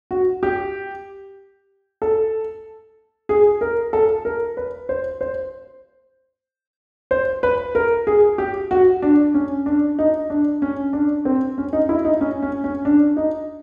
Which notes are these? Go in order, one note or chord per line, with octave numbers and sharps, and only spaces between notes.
F#4
G4
A4
G#4
A#4
A4
A#4
B4
C5
C5
C5
B4
A#4
G#4
G4
F#4
D4
C#4
D4
D#4
D4
C#4
D4
C4
C#4
D#4
E4
D#4
C#4
C#4
C#4
D4
D#4